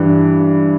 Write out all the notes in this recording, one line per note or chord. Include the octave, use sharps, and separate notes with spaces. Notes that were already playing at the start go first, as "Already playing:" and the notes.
Already playing: G2 E3